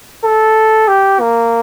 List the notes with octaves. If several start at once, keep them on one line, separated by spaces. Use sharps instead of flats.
A4
G4
A#3